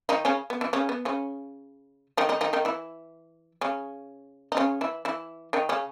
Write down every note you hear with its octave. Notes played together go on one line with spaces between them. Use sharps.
D#3 D#4
C#3 C#4
B3
E3 E4
C#3 C#4
B3
C#3 C#4
D#3 D#4
D#3 D#4
D#3 D#4
D#3 D#4
E3 E4
C#3 C#4
D#4
C#3 C#4
E3 E4
E3 E4
D#3 D#4
C#3 C#4